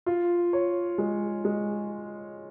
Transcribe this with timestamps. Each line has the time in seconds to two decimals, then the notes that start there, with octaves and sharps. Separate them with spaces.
0.06 F4
0.53 C#5
0.98 G#3
1.45 G#3